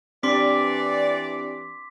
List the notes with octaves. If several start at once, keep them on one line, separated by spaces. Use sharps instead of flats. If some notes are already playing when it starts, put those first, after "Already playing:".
E3 C4 D4 G4 D5 C6 D6 B6